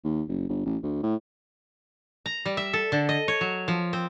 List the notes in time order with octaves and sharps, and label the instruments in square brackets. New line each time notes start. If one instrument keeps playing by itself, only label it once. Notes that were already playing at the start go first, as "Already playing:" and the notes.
[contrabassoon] D#2
F#1
G1
A1
D2
A2
[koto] A#5
G3
E5
A4
D3
D#5
C#5
F#3
F3
C4